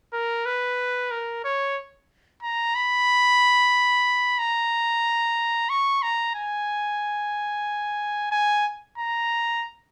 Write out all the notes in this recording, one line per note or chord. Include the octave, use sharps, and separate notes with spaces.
A#4
B4
A#4
C#5
A#5
B5
A#5
C#6
A#5
G#5
G#5
A#5